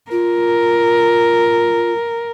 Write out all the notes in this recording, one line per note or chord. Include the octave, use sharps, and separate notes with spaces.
F4 A#4